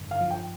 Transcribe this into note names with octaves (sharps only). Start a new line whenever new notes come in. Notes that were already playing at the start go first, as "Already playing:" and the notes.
Already playing: G2 D3
F5
F3
G5